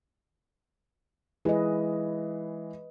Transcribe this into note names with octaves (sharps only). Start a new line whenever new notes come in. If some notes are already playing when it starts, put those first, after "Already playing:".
E3 G#3 B4 D#5